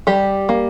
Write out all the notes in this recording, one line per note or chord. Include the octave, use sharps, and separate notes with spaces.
G3 G4
A#3